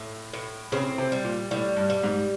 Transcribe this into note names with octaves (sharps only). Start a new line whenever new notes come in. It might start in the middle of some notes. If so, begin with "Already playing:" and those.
Already playing: A2
A2
C#3 C4
C3
G3
A#2
A2 G3
G2
G3
G#2